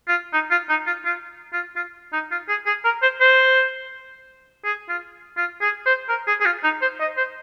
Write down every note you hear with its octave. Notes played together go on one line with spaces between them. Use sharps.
F4
D#4
F4
D#4
F4
F4
F4
F4
D#4
F4
G#4
G#4
A#4
C5
C5
G#4
F4
F4
G#4
C5
A#4
G#4
G#4
F4
D#4
C5
D#5
C5